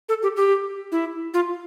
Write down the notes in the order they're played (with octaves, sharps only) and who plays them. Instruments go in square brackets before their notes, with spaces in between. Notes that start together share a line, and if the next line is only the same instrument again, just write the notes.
[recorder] A4
G4
G4
E4
F4